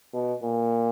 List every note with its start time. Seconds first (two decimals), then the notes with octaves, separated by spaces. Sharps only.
0.13 B2
0.43 A#2